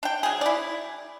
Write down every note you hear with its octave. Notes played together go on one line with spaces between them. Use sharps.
D4 G5
F#3 G#4
E4 D5